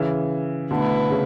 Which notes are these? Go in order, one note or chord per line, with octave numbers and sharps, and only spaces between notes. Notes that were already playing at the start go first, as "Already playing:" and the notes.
Already playing: C#3 E3
B2 D3 A3 E4 B4
C#3